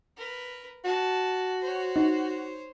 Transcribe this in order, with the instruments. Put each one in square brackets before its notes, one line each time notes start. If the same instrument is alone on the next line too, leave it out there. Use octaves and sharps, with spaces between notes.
[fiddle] A#4 B4
[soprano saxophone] F#4 [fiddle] A5
[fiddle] C5 C#5
[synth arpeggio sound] D#4